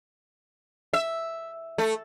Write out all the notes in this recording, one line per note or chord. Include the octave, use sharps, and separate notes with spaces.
E5
A3